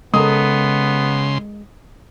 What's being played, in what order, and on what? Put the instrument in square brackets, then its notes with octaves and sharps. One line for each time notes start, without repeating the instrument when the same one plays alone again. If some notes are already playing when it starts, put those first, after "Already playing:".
[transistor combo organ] C#3 C6 [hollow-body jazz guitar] G#3 A#4 A#5 [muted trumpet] B3 [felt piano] A4 D#6